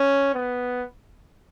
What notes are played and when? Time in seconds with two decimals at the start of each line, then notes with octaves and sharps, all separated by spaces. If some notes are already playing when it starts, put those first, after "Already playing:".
Already playing: C#4
0.34 B3